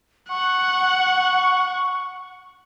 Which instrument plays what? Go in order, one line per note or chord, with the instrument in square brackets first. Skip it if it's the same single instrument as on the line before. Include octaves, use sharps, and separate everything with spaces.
[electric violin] F#5 [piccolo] C#6